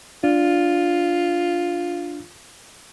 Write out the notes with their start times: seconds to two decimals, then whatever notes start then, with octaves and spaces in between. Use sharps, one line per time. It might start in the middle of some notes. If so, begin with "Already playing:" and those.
0.24 D4 F4